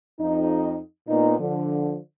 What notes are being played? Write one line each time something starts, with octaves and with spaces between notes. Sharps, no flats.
F2 D#4
A#2 B3 D#4
D3 F3